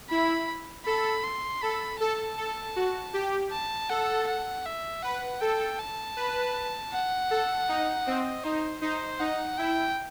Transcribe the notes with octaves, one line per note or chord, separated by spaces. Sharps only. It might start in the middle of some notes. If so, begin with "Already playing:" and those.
E4 B5
A4 B5
C6
A4 B5
A4 A5
A4
F#4
G4
A5
A4 F#5
F#5
E5
B4 F#5
A4 G5
A5
B4
F#5
A4
D#4
C4 D#5
D#4 C5
D#4 C5
D#4 F#5
E4 G5